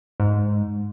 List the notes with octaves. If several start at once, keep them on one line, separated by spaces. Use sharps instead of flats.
G#2